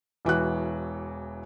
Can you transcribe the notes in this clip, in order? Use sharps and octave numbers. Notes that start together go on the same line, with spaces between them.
E1 E3 F#4 F#6